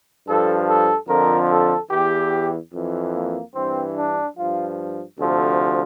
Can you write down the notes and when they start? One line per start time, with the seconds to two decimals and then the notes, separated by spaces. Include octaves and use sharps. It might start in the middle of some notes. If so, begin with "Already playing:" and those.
0.26 G2 F3 A4
0.67 A4
1.08 F2 D3 F3 A#4
1.49 A4
1.91 E2 E3 G4
2.72 F2 E3
3.13 A#3
3.54 G2 E3 C4
3.96 D4
4.36 G2 F3 F4
5.18 D2 C3 F3 A4